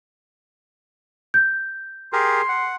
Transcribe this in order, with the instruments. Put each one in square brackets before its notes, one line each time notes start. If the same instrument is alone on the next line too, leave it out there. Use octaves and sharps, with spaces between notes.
[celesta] G6
[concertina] G4 G#4 A#4 [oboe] C6
[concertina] F#5